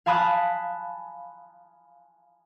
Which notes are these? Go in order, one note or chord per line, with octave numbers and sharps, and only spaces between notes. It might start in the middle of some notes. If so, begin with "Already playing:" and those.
F5 G#5 A5 B5 D#6 F#6